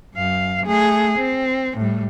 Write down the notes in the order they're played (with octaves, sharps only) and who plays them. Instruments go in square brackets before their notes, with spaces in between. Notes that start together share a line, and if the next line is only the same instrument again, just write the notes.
[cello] F#2 F5
A3 G#4
C4
A2 G3